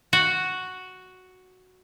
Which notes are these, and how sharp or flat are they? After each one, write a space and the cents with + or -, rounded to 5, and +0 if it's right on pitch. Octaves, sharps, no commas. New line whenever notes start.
F#4 +0